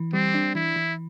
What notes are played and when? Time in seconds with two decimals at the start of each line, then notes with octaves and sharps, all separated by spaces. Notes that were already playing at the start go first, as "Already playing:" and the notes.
Already playing: E3
0.13 G3 C4
0.34 D4
0.55 E3 E4
0.76 E3